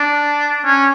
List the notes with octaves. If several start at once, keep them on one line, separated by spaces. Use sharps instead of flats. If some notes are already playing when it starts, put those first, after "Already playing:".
Already playing: D4
C#4